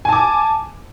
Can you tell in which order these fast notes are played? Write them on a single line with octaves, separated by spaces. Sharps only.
G#5 A5 D6